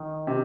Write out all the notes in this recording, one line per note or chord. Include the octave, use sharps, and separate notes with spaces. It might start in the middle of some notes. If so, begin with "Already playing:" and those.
Already playing: D#3
C3